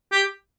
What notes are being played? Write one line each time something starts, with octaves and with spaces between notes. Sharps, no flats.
G4